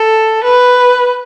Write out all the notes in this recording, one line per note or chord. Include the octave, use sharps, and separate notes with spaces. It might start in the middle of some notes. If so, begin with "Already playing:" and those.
Already playing: A4
B4